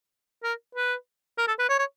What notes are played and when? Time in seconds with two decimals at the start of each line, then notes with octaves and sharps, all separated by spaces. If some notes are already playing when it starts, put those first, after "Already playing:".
0.43 A#4
0.75 B4
1.38 A#4
1.48 A4
1.59 B4
1.69 C#5
1.79 C#5